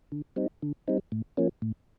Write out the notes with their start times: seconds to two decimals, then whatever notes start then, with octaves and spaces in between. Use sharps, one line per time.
0.12 D3
0.36 G3 C4 D#4
0.62 D3
0.88 G3 C4 D#4
1.12 A2
1.37 F3 A#3 C#4
1.62 A2